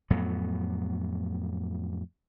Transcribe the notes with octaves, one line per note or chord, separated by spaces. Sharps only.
F2 A2 F#3 B3